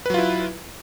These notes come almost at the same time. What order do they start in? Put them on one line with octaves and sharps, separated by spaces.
B4 F#3 F4 E4